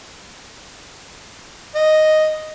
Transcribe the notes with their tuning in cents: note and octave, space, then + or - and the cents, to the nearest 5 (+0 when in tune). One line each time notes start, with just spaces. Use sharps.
D#5 +0